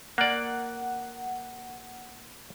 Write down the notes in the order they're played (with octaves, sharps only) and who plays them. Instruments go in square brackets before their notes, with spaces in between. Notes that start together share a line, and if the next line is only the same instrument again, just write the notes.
[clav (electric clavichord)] A#3 D5 [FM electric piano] F#5